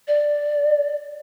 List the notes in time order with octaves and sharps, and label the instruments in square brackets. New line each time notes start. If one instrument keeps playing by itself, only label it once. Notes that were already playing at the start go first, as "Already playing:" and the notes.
[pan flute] D5